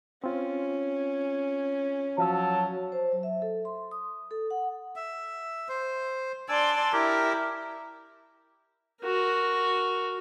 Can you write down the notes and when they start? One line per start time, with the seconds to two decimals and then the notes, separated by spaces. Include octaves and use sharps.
0.24 C4 C#4 F4
2.18 F3 F#3 F5 A5 E6
2.92 C5
3.12 F#3
3.23 E5
3.42 A4
3.65 C6
3.91 D#6
4.31 A4
4.51 F#5
4.96 E5
5.69 C5
6.49 D4 D5 G#5 C6 E6
6.93 E4 G4 A#4
9.02 F#4 A#4